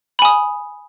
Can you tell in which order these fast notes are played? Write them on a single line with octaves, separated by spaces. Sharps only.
B5 G#5 D#6